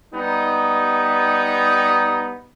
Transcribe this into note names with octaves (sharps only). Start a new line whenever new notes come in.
G3 B3 D#4